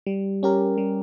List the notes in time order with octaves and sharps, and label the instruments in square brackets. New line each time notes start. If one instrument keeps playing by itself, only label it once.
[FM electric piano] G3
C#4 G4 A#4
G3